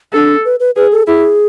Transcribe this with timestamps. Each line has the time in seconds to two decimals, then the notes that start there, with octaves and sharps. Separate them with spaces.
0.13 D4 A4
0.45 B4
0.60 B4
0.76 G#4 B4
0.92 A4
1.07 E4 G#4